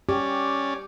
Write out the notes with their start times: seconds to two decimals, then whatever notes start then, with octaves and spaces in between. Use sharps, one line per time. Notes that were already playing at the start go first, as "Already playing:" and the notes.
0.09 C#4 G4 D5